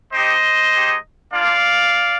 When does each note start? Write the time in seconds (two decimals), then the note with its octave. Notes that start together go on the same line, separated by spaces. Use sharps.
0.12 C4 D#4 G4 C5 D#5
0.73 G#3 D#4 G4
1.32 A#3 D4 F4 D5 F5